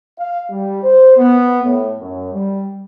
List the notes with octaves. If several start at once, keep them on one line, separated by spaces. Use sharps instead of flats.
F5
G3
C5
B3
A2
F#2
G3